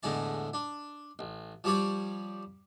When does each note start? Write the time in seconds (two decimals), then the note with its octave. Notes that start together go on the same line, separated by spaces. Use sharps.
0.03 E2 A2 D3 G#3 A5
0.54 D4
1.19 A1
1.64 F3 G3 G4 C#5 D5